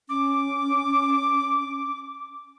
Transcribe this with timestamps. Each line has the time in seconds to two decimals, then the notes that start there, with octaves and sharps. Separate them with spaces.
0.09 C#4 D6